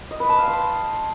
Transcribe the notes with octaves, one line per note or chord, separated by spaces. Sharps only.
D#5
B4
A5
F5
C6